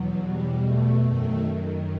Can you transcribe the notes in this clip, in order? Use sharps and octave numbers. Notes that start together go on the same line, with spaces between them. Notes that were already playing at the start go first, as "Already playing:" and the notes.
Already playing: E2 B2 F#3
G3
A3
F#2 D#3